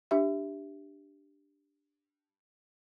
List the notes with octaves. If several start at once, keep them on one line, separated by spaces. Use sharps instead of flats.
D4 G4 E5